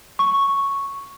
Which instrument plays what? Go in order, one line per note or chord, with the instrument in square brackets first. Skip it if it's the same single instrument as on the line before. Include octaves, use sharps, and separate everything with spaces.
[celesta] C#6